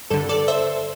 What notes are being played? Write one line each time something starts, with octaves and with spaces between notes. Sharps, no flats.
G2 D3 A4
A4 D5
C5 E5